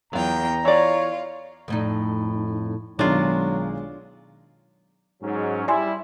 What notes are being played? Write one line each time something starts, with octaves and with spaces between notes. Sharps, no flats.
E2 F#3 F4 G5 A#5
E3 F4 C#5 D5
F2 A2 D#4
B1 D#3 F#3 G#3 D4 F4
G#2 F#3 C#4
G3 E4 D5 G#5 C6